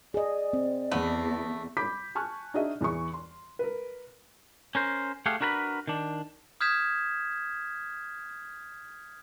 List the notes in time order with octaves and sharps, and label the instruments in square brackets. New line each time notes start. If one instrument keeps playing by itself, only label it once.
[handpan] G#4 D#5 [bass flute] D5
[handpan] C4
[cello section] E2 [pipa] A3 B3
[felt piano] B5 D6 G6 B6
G#5 A5 C#6 F6 F#6
D4 D#4 F#4 G#4 D#5 E5
E2 E3 E4 C#6
C6
A#4 B4
[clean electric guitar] C#4 A#4 C5
A3 G4 G#4 F5 F#5
D4 F#4 A#4 B4 A5 B5
D#3 D4
[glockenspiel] D#6 F6 G6 G#6 B6 E7